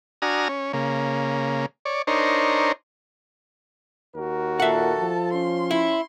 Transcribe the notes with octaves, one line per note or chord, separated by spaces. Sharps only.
D4 F#4 G#5 A#5 D#6 F6
C#4
C#3 A#3
C#5 D5
D4 D#4 A#4 C5 C#5
D#2 F#4 A#4
A#2 A4 E5 F#5 A5
F3
C#4 C6
E4